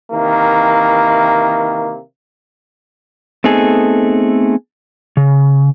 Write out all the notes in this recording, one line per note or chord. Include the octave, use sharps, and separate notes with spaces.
C3 D#3 E3 A#3
A3 B3 C4 D#4 G#4 A4
C#3